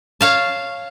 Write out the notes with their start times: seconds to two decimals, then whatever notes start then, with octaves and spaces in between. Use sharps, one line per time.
0.21 C#5 F5 A5